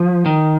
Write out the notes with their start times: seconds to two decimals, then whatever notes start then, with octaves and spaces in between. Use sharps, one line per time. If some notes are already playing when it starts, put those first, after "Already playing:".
Already playing: F3
0.26 D#3